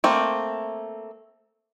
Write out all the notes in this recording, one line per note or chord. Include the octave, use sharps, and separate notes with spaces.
A3 A#3 C4